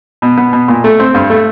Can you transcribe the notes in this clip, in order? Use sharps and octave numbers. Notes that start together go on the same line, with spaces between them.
B2
B3
B2
A#2
A3
C4
G2
A3